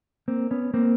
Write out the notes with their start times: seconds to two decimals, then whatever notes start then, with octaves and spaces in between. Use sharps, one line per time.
0.28 A#3 C4
0.51 B3 C#4
0.74 A#3 C4